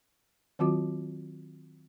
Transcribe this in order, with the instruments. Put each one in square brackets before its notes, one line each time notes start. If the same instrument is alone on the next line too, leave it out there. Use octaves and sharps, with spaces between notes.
[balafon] D#3 F#3 C4 F4 F#4 D6